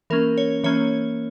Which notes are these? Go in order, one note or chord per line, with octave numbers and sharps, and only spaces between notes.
E3 A#3 C#4 A#4
C#5
E3 A#3 C#4 C#5